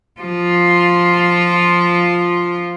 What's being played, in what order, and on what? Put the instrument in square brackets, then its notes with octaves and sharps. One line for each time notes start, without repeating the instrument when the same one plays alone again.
[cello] F3 F4